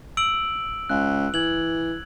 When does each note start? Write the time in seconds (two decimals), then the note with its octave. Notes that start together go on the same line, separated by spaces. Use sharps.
0.17 E6 D7 F#7
0.89 C#2 F#6
1.34 E3 G#6 F#7